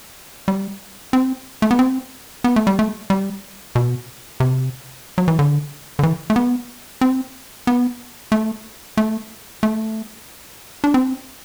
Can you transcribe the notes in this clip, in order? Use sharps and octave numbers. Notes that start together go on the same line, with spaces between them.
G3
C4
A3
B3
C4
B3
A3
G3
A3
G3
B2
C3
F#3
E3
D3
D3
E3
A3
B3
C4
B3
A3
A3
A3
D4
C4